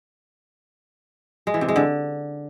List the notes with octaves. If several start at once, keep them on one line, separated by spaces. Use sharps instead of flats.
G#3
E3
C3
G#3
D3